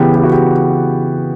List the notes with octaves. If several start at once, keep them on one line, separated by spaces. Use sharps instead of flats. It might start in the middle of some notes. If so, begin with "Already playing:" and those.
Already playing: C#3 E3 B3 G4
G4
F#4
G4